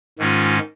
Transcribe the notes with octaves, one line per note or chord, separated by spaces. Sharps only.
G#2 D#3 G#3 C#4 F4